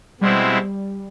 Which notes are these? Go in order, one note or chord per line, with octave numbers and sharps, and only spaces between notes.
B2 G3 G#3 C4 E4